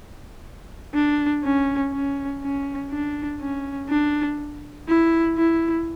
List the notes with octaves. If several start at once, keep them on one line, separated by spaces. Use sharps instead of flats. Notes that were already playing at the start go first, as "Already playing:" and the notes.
D4
C#4
C#4
C#4
D4
C#4
D4
E4
E4